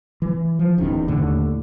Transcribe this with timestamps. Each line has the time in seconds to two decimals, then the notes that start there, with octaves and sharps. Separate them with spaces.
0.22 E3
0.59 F3
0.78 D1 E2 D#3 C#4
1.08 D#2 A2 D3